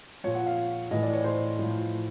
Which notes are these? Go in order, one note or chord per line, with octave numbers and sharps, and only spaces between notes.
A#2 F3 C#5
F#5
F5
A2 E3 D#5
D5
C#5
C5
A2 F3